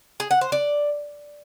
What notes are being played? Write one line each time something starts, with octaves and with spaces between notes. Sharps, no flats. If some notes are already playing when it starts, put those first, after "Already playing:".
G#4
F#5
C5
D5